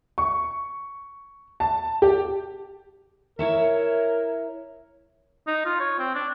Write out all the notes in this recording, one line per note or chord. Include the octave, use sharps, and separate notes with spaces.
C#6
A5
G4
E4 A#4 C#5 E5
D#4
F4
C#5
C4
D4